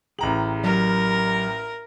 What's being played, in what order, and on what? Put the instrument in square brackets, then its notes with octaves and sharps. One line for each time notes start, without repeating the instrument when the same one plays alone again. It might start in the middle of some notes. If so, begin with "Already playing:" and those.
[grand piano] A1 A#5 F#7 [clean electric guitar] G#4 G5
[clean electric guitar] F#3 G4 D5 [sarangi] A#4